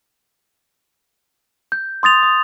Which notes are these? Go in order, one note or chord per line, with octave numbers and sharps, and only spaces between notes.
G6
C6 D#6 A6 F7
D#6